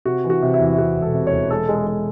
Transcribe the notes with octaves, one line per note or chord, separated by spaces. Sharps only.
C3 F#4
E3
F#4
C3
E4
E2
C3 F#4
E1
A4
C3
C#5
E1
G#3 A4
G#3
A4
G#3